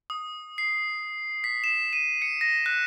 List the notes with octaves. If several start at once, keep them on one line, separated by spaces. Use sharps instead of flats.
D#6
C7
B6
E7
D#7
C#7
A#6
F#6